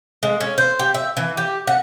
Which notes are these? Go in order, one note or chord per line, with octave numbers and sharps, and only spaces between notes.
G#3
C#4
C5
G4
E5
E3
G4
F#5